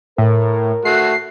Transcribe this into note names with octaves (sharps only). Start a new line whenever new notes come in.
A2 A#4
A3 F#4 C7